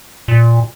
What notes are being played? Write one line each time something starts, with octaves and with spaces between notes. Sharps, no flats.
A#2